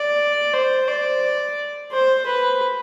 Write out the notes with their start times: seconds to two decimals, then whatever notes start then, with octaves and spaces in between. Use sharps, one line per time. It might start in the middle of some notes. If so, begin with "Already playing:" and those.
Already playing: D5
0.53 C5
0.88 D5
1.92 C5
2.26 B4